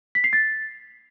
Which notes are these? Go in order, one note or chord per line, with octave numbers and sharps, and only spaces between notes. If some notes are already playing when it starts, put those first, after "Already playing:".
B6
C7
A6